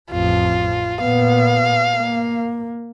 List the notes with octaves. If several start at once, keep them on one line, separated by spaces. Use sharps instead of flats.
A1 F2 F4
A#2 B3 F5
A#3